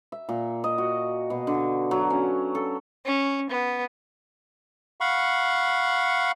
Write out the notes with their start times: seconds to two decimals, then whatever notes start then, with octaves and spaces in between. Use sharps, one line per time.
0.12 E5
0.29 A#2
0.64 D#5
0.78 F#4
1.30 B2
1.47 D3
1.91 F#3
2.10 C#4
2.55 A4
3.06 C#4
3.50 B3
5.00 F5 F#5 B5 C#6